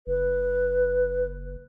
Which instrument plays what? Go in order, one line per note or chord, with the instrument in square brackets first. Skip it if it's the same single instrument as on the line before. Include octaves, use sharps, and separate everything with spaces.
[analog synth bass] F#1 [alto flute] B4